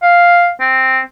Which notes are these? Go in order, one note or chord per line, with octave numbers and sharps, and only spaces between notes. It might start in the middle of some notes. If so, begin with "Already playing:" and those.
F5
C4